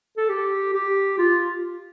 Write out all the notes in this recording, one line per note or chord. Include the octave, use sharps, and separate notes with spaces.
A4
G4
G4
F4